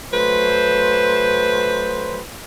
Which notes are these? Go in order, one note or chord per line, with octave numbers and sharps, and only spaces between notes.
F#3 A3 B4 C5